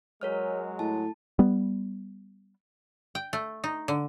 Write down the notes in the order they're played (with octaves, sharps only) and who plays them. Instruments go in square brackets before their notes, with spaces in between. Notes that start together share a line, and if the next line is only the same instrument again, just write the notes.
[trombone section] F#3 G#3 [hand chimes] A#4 C#5 F6
[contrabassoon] A2 [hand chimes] A5
[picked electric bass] G3 B3
[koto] G5
A3
D#4
D3